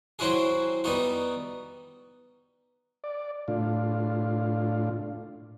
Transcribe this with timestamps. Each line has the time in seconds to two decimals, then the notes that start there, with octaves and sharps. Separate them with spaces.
0.19 F#3 C4 E4 F#4 G#4
0.84 G3 B3 D#4 F#4
3.04 D5
3.48 A2 D4 F4